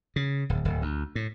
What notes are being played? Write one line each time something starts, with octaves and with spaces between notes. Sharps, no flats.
C#3
D1
D1
D2
A2